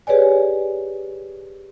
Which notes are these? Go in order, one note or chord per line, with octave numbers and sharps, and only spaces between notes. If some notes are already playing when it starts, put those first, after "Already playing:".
G4 G#4 B4 C#5 D5 G#5